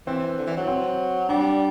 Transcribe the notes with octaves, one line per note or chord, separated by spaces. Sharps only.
E3 C4
D3
E3
F#3
C4
G3 D4